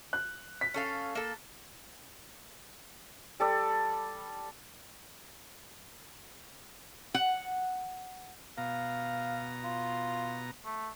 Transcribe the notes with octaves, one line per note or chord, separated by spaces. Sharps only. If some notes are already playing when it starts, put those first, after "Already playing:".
F#6
B6
C#4 A4 F5
A#3 A4
G3 A4 D5
F#5
B2 F5 A#5
F4
A3